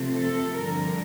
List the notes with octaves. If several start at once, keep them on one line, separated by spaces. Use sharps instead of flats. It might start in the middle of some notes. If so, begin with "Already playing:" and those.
Already playing: C3 F3 A3 C4
A4
G2 D3 F3 A#4